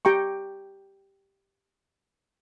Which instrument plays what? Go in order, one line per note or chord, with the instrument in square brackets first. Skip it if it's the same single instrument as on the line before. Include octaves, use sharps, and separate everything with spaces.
[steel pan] G4 G5 A#5 C#6